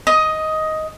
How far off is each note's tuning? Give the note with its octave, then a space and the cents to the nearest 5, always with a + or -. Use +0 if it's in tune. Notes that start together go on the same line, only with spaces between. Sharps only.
D#5 +10 D#6 +0